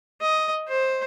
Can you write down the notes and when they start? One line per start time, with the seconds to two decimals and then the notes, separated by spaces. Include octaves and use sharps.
0.21 D#5
0.68 C5